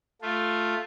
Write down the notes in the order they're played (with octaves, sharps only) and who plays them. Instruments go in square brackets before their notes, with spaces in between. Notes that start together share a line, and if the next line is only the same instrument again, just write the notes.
[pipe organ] A3 F4